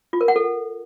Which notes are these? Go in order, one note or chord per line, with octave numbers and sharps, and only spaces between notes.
F4
A#4
F#5
A4